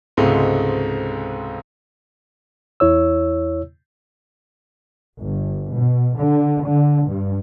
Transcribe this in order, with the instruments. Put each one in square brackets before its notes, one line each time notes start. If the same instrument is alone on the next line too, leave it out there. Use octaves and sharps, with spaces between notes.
[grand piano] C#2 G#2 C3 G#3 A3
[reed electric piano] E2 E4 C#5 E6
[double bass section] G1
B2
D3
D3
G2